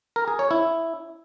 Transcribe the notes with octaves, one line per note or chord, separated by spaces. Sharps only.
A#4
G#4
C#5
E4